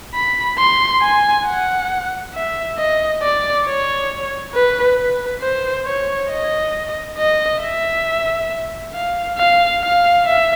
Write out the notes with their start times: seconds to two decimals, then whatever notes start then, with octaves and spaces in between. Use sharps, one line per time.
0.14 B5
0.58 C6
1.02 G#5
1.46 F#5
2.34 E5
2.78 D#5
3.22 D5
3.66 C#5
4.54 B4
4.97 B4
5.41 C5
5.86 C#5
6.30 D#5
7.18 D#5
7.62 E5
8.94 F5
9.38 F5
9.82 F5
10.26 E5